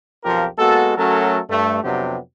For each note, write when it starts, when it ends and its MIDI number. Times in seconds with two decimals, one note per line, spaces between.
0.25 0.47 35
0.25 0.47 41
0.25 0.47 53
0.25 0.47 65
0.25 0.47 67
0.25 0.47 70
0.58 0.93 56
0.58 0.93 58
0.58 0.93 59
0.58 0.93 66
0.58 0.93 69
0.97 1.39 54
0.97 1.39 57
0.97 1.39 61
0.97 1.39 66
0.97 1.39 69
0.97 1.39 70
1.49 1.80 43
1.49 1.80 57
1.83 2.18 41
1.83 2.18 48
1.83 2.18 54
1.83 2.18 59
1.83 2.18 62
1.83 2.18 67